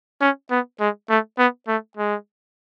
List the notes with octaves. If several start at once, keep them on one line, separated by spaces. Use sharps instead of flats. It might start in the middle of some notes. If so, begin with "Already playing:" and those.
C#4
B3
G#3
A3
B3
A3
G#3